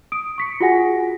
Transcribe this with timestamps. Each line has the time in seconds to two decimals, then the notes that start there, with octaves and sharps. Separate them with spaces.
0.12 D#6 D7
0.38 C#6 B6 C#7
0.60 F4 F#4 G#4 F#5 G#5 A#6